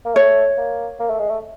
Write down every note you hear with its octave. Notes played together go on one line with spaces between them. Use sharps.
A#3
A3 C#5
A#3
A#3
A3
G#3
A3